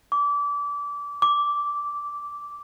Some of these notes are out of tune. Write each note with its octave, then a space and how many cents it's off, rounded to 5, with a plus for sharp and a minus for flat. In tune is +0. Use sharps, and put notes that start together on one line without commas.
D6 -25
D6 -10